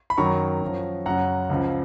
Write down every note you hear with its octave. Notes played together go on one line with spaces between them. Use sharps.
B5
F#2 D#3 F#3 A#5 C#6
F#2 F3
F#2 C#3 F#3 F#5 A#5
C#2 C#3 F3